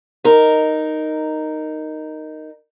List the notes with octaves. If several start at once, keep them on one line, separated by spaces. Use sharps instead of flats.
D#4 A#4